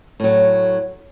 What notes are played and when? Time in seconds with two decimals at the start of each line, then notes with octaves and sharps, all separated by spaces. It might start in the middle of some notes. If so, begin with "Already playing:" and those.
0.20 A2 F#3